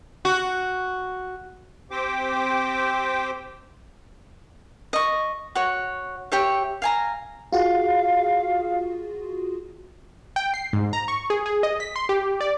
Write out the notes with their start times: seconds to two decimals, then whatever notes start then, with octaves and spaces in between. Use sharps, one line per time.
0.25 F#4
1.91 C4 G4 C5 G5 D6
4.93 D#5 C#6
5.55 F#4 C#5
6.32 G4 C#5 E5
6.82 F5 G#5 A#5
7.53 F4 F#4 G#4 F5
10.36 G5
10.54 C7
10.73 G#2
10.93 A#5
11.08 C#6
11.30 G#4
11.46 G#4
11.63 D#5
11.80 B6
11.96 C6
12.09 G4
12.41 D5